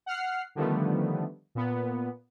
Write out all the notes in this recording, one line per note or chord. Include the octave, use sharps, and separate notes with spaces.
F#5 F6 C7
D3 D#3 F3 G3 A3 B3
A#2 B3